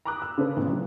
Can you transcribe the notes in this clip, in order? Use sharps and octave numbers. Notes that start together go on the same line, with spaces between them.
A#5 B5 D6 D#6 F#6
E6
C#3 A#3 C#4 A4 B4 C5
A1 B2
C#3 E3 F#3